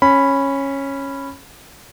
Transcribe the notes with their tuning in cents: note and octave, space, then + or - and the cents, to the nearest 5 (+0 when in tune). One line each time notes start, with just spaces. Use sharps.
C#4 -10 B5 +0